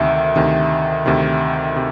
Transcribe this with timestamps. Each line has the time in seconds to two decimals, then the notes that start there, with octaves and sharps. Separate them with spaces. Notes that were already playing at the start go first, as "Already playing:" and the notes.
Already playing: D2 C3 D#3 E5
0.36 D2 C3 D#3
1.06 D2 C3 D#3
1.76 C3